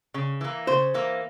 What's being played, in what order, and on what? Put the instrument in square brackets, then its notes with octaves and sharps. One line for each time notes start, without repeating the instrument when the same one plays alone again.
[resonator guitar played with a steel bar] C#3
E3 A#3
[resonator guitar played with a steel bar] C#3 [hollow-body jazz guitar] C5
[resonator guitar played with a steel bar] E3 A#3